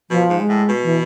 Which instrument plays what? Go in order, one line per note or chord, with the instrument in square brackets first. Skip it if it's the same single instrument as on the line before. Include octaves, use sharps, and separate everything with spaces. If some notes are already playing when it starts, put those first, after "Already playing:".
[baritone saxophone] B2 [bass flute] F3
[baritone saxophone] G#2
[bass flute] G#3
[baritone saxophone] A2
B2
[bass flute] E3